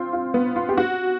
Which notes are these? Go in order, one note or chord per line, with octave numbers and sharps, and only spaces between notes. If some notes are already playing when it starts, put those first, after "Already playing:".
Already playing: C4 F4
F4
B3
F4
G4
F#4